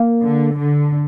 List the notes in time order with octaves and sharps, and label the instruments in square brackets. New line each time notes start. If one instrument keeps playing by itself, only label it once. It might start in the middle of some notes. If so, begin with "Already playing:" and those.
Already playing: [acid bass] A#3
[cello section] D3
D3